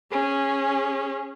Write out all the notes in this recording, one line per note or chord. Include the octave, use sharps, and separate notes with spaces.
C#4 G#4